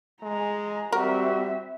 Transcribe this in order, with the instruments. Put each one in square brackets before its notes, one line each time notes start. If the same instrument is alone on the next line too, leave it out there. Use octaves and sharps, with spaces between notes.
[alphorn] G#3 [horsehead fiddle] A#5
[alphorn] G3 [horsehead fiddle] C4 E5 [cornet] F#4 [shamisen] A#4